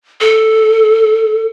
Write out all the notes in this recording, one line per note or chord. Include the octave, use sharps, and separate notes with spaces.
A4